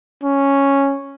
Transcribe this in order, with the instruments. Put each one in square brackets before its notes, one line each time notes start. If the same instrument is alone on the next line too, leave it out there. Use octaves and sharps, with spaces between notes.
[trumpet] C#4